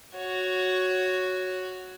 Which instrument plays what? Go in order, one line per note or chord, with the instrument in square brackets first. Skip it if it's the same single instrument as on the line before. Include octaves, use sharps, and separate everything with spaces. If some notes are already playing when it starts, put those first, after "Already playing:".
[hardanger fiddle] F#4 C#5